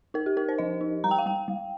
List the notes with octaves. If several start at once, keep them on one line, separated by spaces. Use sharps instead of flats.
D#4 A#4
G4
D#4 A#4
C5
F3 D#5
D#4
G3 A#5
G5
F5
G3 G5
G3